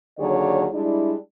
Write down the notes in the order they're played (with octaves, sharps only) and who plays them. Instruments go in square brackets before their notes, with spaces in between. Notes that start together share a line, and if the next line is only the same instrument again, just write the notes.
[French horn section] D#2 D3 F#3 G#4 C#5 D5
G3 G#3 D4 E4